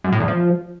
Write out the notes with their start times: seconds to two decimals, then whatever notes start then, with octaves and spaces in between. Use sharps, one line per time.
0.04 F#2
0.12 A2
0.20 E2
0.28 F3